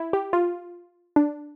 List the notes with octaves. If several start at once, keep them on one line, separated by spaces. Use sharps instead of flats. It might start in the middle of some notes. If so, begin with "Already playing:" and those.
Already playing: E4
G4
F4
D4